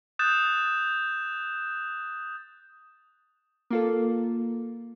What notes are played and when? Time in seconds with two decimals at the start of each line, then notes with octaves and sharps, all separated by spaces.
0.19 D#6 F#6 G6 A6 E7
3.70 A#3 F4 A4